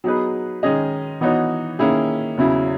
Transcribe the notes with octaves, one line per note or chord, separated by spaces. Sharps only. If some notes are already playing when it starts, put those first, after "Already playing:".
F#3 B3 D#4 G#4 B4
D#3 G#3 C#4 G#4 D#5
E3 B3 D#4 F#4 C#5
D#3 A#3 C#4 E4 G#4
E2 C#3 F#3 C#4 E4